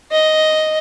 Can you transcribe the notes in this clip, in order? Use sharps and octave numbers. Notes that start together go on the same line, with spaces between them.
D#5